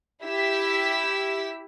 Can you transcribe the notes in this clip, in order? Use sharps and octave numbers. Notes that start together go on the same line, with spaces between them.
E4 G4 E6 B6